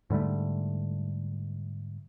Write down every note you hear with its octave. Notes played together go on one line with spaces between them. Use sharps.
G#2 D3 G3 A3